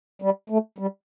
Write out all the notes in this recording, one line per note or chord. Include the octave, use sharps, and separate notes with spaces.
G3
A3
G3